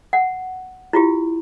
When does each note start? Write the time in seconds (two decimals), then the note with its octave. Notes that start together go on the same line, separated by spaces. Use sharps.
0.13 F#5
0.93 E4 F4 G4